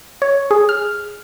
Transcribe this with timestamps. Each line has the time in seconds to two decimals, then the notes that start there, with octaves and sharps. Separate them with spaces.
0.22 C#5
0.51 G#4
0.69 F6